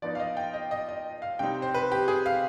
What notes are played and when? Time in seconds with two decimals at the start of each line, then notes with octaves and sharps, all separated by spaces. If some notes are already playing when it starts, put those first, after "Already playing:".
0.02 F3 B3 D#4 D5
0.15 F5
0.20 D#5
0.37 G5
0.54 D#5
0.71 D#5
0.89 D#5
1.22 F5
1.39 C3 G3 C4 D#4 G5
1.62 C5
1.74 B4
1.92 G4
2.08 G#4
2.26 F5